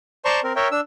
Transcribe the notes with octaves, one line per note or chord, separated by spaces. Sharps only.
C5 D5 A5 A#5 C6 C#6
C4 A#4
A#4 C#5 E5 G5
D4 E6